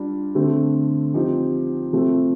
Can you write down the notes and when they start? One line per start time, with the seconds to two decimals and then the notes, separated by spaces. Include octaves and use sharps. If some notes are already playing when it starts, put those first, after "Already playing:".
Already playing: G3 D4 F4
0.35 D3 A3 C4
1.14 F3 C4 D#4 G4
1.93 C3 F3 A3 C4